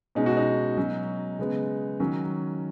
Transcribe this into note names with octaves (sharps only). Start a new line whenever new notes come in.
B2 G#3 C#4 D#4
F#4
D#4
B2 F#3 C#4
C#3 G#3 B3
D#3 F#3 C#4